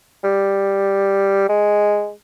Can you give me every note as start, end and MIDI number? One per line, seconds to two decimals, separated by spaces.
0.24 1.48 55
1.49 2.11 56